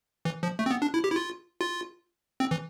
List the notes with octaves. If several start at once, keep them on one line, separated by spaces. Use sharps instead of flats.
E3
F3
A3
C4
B3
D4
E4
G4
E4
F4
F4
C4
E3